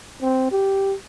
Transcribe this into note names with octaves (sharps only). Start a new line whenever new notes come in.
C4
G4